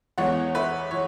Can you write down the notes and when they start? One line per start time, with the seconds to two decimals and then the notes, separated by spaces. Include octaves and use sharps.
0.18 E2 E3 G#3 B3 C#5 F#5
0.55 B4 E5
0.91 E3 C#5